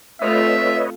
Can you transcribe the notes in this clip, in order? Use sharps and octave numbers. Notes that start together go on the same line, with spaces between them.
A3 C4 F4 B4 C#5 D#5 E5